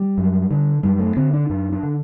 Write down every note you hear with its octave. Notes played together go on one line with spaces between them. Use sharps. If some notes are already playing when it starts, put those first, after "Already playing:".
Already playing: G3
F#2
D3
F#2 G3
A3
D3 C4
D4
F#2 D4
D4
D3